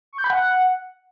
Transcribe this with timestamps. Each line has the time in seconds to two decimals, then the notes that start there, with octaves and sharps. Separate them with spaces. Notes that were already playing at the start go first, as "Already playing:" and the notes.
0.13 C#6
0.18 G6
0.24 B5
0.30 F#5